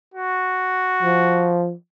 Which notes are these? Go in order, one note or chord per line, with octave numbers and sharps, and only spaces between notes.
F#4
F3